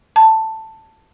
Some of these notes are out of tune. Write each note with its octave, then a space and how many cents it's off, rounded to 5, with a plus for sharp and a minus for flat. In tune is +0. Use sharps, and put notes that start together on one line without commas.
A5 +10